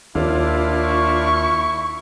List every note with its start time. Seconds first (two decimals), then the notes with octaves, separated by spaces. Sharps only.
0.15 D#2 D4 E4 F4
0.83 C#6